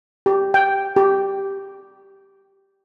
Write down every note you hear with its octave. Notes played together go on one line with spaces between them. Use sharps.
G4
G5
G4